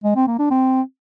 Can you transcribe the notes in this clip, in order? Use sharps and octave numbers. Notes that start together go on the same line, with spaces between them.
G#3
C4
A#3
D4
C4